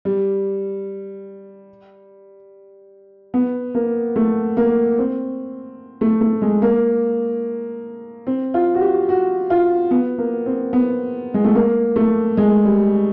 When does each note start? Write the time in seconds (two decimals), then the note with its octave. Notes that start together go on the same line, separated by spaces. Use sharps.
0.05 G3
3.34 B3
3.75 A#3
4.16 A3
4.57 A#3
4.98 C4
6.01 A3
6.21 A3
6.42 G#3
6.62 A#3
8.27 C4
8.54 F4
8.75 F#4
8.81 G4
9.09 F#4
9.50 F4
9.91 B3
10.18 A#3
10.46 C4
10.73 B3
11.34 G#3
11.45 A3
11.55 A#3
11.96 A3
12.37 G#3
12.65 G3